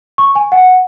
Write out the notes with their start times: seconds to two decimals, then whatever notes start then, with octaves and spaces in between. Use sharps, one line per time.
0.18 C#6
0.35 G#5
0.52 F#5